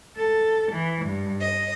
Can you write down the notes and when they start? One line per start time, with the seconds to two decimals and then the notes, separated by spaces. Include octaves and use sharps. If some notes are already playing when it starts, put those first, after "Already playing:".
0.16 A4
0.71 E3
1.06 G2
1.40 D#5